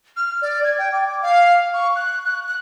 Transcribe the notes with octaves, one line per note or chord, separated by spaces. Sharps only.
F6
D5
G#6
G5
D6
F5
C#6
F#6
F#6
F#6